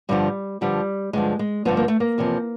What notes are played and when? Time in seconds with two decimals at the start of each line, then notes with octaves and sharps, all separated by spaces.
0.09 G2 D3 F3 G3
0.61 G2 D3 F3 G3
1.13 G2 D3 F3 G#3
1.39 G#3
1.65 G2 D3 F3 B3
1.77 A#3
1.88 A3
2.00 A#3
2.18 E2 C3 F3